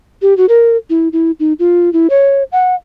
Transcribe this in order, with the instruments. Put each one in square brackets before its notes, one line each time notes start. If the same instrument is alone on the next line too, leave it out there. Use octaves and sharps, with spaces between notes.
[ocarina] G4
F#4
A#4
E4
E4
D#4
F4
E4
C#5
F#5